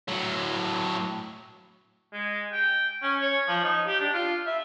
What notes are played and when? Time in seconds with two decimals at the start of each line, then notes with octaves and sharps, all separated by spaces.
0.08 A2 F#3
2.13 G#3
2.52 G5
3.03 C#4
3.22 C#5
3.48 F3
3.63 D#4
3.87 G4
4.00 D4
4.14 F4
4.47 E5